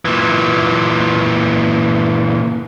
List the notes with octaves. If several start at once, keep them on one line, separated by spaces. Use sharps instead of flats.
A#2 E3